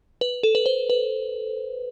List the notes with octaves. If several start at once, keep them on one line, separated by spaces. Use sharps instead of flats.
B4
A4
B4
C5
B4